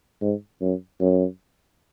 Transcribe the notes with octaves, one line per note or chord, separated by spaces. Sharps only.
G#2
F#2
F#2